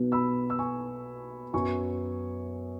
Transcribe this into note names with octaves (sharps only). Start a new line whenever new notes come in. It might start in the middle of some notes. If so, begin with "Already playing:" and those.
Already playing: B1 B2 B3
B5 E6
E6
G#5 C#6
F#2 F#3 B3 G#5 C#6